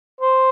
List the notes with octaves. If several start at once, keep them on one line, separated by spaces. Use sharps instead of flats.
C5